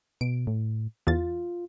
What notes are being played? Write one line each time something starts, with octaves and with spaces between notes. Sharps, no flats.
B2 D7
A2
E2 F4 A6